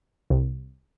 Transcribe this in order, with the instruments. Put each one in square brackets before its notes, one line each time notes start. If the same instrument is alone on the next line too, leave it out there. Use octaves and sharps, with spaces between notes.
[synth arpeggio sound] C2 C3